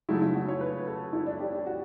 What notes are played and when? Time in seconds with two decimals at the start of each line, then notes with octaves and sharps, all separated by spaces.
0.09 C#3 F#3 A3 E4
0.22 E4
0.35 F#4
0.48 C#5
0.61 B4
0.87 A4
1.13 E4
1.26 D4
1.39 G4
1.52 G4
1.66 F#4